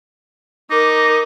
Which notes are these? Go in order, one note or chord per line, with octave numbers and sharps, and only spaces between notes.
D#4 A#4 D6